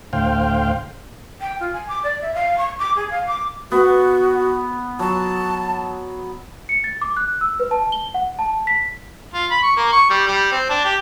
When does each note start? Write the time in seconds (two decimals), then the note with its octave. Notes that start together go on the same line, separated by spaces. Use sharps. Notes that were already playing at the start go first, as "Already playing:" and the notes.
0.13 D2 A2 C5 F5 G5
1.41 G5
1.60 F4
1.73 G#5
1.88 D6
2.03 D5
2.21 E5
2.34 F5
2.58 C#6
2.78 D6
2.96 G#4
3.10 F5
3.26 D6
3.72 B3 F#4
4.99 F#3 A5
6.69 C#7
6.84 A6
7.01 D6
7.17 F#6
7.41 E6
7.60 B4
7.71 A5
7.92 G7
8.14 F#5
8.39 A5
8.67 B6
9.34 F4
9.51 B5
9.63 C#6
9.77 A#3
9.92 C#6
10.10 G3
10.27 G3
10.52 C4
10.70 D4
10.85 G4